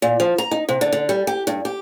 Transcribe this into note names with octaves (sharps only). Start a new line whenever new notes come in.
A#2
F3
A#5
D#4
C3
D3
D3
G3
G4
G2
G4